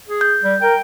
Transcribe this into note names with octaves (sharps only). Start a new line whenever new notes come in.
G#4
G6
G3
A#4 G5